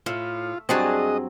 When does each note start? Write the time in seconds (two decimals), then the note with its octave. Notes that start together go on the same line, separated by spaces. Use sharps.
0.06 A2 F4 E5
0.69 G2 F#3 C4 D4 G#4 D#5 A5